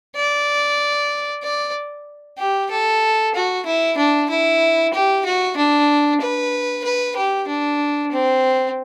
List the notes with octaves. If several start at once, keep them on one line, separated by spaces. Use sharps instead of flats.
D5
D5
G4
A4
F#4
E4
D4
E4
G4
F#4
D4
B4
B4
G4
D4
C4